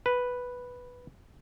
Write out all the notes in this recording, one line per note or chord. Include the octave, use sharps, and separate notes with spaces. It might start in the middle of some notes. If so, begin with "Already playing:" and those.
B4